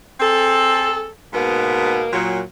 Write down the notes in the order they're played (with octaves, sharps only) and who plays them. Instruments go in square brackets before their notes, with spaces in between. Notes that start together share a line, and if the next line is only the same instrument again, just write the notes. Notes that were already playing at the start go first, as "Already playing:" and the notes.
[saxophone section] C4 G#4 A4
G#2 B2 A#3 B3
A#2 F#3